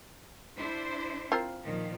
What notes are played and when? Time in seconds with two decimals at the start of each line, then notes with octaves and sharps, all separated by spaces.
0.56 D4 E4 C5
1.32 C4 F4 A#4
1.64 A#2 D#3 F3